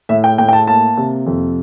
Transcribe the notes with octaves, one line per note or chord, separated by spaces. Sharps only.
A2 E5
G5
A2 G5
G5
A5
A#3 A5
C3
F2